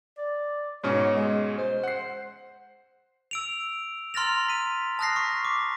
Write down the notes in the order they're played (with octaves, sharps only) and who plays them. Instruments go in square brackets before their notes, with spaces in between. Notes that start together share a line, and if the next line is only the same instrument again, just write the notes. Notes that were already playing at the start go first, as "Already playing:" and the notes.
[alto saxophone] D5
[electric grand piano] G#2 B2 C#4 [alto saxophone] C#5
[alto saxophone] G#3
C5
[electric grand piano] F#5 C7
[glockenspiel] E6 D7 F7
A#5 C6 F6 A6 A#6 F7
B6 D#7
A5 D#6 F6 F#6 A#6 C7
C#6 B6
D6